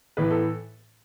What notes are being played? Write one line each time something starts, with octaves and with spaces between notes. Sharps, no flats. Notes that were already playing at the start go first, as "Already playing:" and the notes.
A2 E3 B3 B4
A4